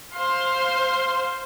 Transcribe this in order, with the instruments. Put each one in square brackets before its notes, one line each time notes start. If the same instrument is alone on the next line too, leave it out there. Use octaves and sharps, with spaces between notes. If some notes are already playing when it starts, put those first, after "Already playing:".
[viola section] C5 F5 C6